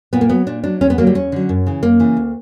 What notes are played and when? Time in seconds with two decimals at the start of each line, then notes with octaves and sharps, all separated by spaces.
0.13 A#2 B3
0.21 A#3
0.30 F#3 B3
0.47 A#2 D4
0.64 F#3 D4
0.81 E2 C#4
0.90 B3
0.98 D3 F#3 A#3
1.07 G3
1.15 E2 C#4
1.32 D3 F#3
1.49 F#2
1.67 C#3 E3
1.83 F#2 A#3
2.00 C#3 E3
2.17 D2